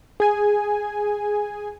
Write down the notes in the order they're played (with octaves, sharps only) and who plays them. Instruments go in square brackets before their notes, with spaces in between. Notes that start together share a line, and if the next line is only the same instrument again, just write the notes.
[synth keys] G#4 G#5